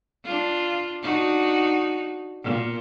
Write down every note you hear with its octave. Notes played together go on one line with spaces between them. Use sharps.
D4 F4
D4 D#4 F#4
A#2